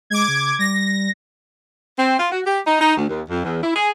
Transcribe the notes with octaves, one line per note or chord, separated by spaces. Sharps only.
G#3 D6 G#6
C#3
G3 A#6
C4
F4
F#4
G4
D#4
D#4
D2
D#2
F2
E2
E4
G#4